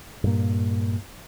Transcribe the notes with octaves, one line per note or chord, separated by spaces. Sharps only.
G2 A#2 A#3